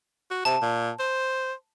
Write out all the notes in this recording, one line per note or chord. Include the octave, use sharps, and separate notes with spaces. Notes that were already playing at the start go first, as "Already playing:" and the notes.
F#4
C3 A5
A#2
C5